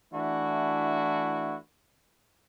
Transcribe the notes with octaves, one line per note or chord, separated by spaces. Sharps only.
E3 A3 D4 E4 F#4